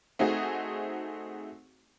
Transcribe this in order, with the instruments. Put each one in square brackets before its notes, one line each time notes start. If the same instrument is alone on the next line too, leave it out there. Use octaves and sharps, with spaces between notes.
[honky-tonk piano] A3 C4 D#4 F#4 G#4